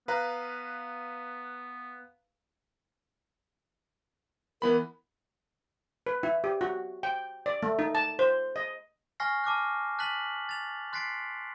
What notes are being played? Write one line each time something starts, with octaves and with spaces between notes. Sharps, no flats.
B3 B4 F5 A#5
E3 B3 A#4 B5
B4
E4
G4
F#4
G5
D5
A3
D#4
A5
C5
D#5
G#5 C#6 F6 A#6 C7
A5 D6 F6 F#6
A5 F#6 A6 B6 F#7
A6 F7
C6 F#6 A6 B6 C7 D7